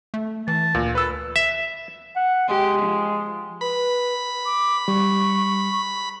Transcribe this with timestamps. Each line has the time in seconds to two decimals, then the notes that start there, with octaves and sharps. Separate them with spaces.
0.14 A3
0.48 E3 A5
0.75 D2 A#2
0.95 A4 B4 E6
1.36 E5
2.16 F#5
2.48 G#3 G4
2.81 F3
3.61 B4 B5
4.46 D6
4.88 G3 C#6